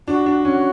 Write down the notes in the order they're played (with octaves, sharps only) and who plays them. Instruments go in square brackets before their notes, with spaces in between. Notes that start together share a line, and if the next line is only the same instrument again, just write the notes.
[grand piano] D4 [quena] F#4
[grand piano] D4
C#4